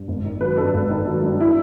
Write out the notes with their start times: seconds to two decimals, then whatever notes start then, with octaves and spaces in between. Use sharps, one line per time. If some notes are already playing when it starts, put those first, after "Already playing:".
Already playing: G2
0.08 G#1
0.25 D#3
0.41 F#3 B4
0.57 G2 A4
0.74 G#1
0.90 D#3
1.07 F#3
1.23 G2
1.40 E4